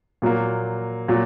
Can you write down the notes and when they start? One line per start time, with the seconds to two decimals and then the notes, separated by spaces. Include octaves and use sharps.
0.22 A#2 F#3 A#3
1.08 A#2 F#3